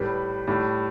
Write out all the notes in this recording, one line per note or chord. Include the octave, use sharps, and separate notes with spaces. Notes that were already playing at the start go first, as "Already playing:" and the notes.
Already playing: A2 G3 B4
A2 G3